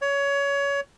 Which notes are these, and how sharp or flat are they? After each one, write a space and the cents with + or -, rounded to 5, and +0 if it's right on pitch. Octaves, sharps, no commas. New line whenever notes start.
C#5 +20